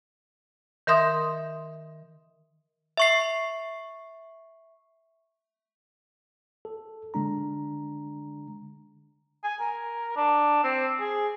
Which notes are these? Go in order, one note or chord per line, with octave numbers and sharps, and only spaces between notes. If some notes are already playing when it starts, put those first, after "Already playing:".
D#3 A#4 E5 C6 D#6
E5 C#6 C7
A4
D3 G#3 D4 A#5
G#5
A#4
D4
C4
G#4